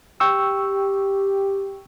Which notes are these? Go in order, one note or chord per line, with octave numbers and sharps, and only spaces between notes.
G4 G5 C#6 E6